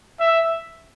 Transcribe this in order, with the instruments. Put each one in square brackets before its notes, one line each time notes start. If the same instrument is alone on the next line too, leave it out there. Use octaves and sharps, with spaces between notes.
[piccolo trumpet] E5